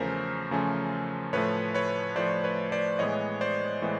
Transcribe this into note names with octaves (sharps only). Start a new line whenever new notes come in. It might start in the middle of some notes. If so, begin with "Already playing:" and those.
Already playing: E2 C#3 F3 A3 C#4 A#4 C5
E2 C#3 F3 A3 C#4
A2 F3 A3 B4 C#5
B4 C#5
A2 F3 A3 C5 D5
B4 C#5
C5 D5
A2 E3 G#3 B3 C#5 D#5
C5 D5
A2 E3 G#3 B3